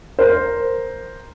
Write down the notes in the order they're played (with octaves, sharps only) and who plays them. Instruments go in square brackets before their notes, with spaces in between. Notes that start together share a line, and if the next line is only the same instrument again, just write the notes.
[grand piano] A#4 C5